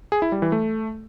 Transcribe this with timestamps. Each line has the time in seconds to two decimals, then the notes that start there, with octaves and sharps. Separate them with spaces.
0.12 G#4
0.22 E4
0.32 G3
0.42 E3
0.52 A3